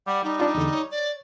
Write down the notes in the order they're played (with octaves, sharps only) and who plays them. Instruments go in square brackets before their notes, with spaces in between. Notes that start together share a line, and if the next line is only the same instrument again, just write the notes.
[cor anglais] G3 [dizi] F#5
[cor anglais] G3 [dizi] D#4
[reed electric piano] D4 F4
E2 D3
C#5
[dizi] D5